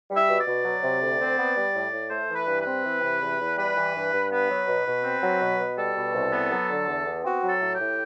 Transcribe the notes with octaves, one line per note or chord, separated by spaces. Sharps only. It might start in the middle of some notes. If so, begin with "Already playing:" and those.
G3
E5
B2
D5
B2
F#3
C3
D2
C4
B3
G3
A2
A2
A3 C5
E3
B4
G2
B4
C4
E3
C3
E2
E2
G3 B4
E3
G2
G2
B3 B4
F#3
B2
B2
C4
F#3
B2
B2
G3 A4
B2
C2
B3
F#3
D3
E2
B3
C4 F#4
F#3
A4
A2
G4
A2